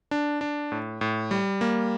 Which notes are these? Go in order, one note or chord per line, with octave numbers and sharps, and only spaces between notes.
D4
D4
A2
A2
G3
A#3